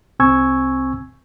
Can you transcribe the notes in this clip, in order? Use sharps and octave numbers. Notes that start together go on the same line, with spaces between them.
C2 C4 G#5 C#6 E6 G#6